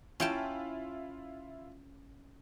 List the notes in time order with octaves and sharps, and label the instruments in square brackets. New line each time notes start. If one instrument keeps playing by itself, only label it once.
[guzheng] C#4 G5 A5 [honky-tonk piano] E4 F4